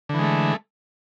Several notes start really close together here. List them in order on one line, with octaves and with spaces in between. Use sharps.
D3 E3 G#3 A3